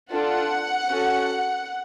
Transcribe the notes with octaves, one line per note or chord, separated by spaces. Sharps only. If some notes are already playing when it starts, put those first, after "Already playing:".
D4 F4 A4 F#5
C#4 F#4 A4